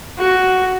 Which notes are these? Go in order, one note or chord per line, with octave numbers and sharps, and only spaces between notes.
F#4